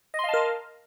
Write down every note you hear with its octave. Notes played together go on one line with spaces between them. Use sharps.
A#4 D#5 F5 A5 C6